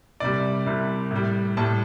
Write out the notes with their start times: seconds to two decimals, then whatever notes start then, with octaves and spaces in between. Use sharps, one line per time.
0.20 C2 C3 G3 D5
0.66 C2 C3 G3
1.11 A2 G3
1.57 A2 G3 A5